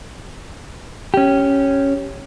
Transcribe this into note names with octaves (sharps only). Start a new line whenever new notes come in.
C#4 G4